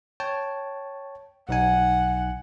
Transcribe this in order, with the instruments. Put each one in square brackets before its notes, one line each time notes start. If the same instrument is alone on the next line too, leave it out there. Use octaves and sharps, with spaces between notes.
[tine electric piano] C#5 G5 A5
[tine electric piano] B1 D#4 G#5 [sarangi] F#5